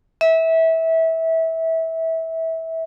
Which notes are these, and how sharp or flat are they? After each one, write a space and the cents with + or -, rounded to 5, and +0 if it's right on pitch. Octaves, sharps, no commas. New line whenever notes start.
E5 -20